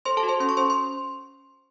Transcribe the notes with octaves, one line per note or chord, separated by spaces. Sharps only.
A4 C5 C6
A4 A5
F#4
C5 C6
C#4 C6
C#6
C#4 C5 C6
C6